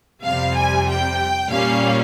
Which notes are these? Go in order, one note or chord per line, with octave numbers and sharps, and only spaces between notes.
F2 C3 G3 F5
G#5
G5
A#2 G3 A#3 C#4 F5